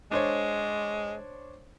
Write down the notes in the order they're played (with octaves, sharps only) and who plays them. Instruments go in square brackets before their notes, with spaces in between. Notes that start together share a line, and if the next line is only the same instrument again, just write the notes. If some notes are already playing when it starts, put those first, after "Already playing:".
[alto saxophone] G#3 [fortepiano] D4 C5 C#5